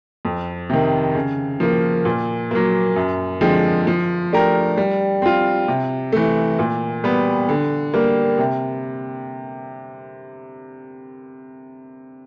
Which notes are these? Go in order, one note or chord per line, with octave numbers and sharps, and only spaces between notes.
F2
C3 D#3
C#3
F3 A#3
A#2
F#3 A#3
F#2
D3 F3 G#3 C4
F3
A3 D4 G4 A#4
G3
C4 F4
C3
E3 A3
A#2
G3 B3
D3
G3 A#3
C3